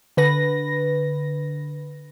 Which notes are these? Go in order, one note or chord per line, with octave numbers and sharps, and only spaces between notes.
D3 B4 A#6